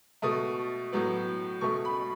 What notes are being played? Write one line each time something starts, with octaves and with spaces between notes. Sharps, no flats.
B2 A3 D#6
A2 F#3 B3
B2 A3 C#6
B5